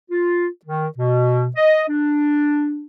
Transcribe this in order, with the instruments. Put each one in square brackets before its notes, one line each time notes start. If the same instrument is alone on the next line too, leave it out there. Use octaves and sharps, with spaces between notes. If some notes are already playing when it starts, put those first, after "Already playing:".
[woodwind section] F4
D#3
B2
D#5
D4